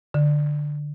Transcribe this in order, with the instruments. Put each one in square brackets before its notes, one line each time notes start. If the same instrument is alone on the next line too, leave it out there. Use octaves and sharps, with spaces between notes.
[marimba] D3